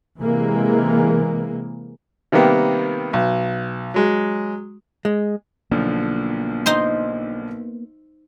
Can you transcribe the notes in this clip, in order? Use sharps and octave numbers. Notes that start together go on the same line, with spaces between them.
C3 E3 G#3 A#3
C3 D#3 G3 A#3 B3
B1
F#3 G#3
G#3
B1 D3 F3 A#3 B3
D#4 C5 C6